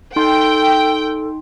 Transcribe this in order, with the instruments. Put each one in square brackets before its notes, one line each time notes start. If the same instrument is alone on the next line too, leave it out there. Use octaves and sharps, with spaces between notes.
[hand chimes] D#4 C6 [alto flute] A4 [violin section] G5